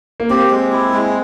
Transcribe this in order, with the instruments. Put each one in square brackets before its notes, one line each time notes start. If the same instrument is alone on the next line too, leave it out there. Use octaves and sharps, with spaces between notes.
[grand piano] A#3
[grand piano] C4 [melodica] G4
[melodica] G#3
E4
G#3